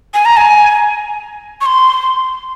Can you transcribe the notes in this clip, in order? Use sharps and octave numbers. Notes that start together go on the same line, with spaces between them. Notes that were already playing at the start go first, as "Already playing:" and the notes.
G#5
A#5
G#5
C#6
C6